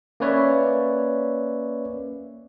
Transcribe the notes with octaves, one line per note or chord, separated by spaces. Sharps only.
A#3 C#4 B4 C#5 D5 E5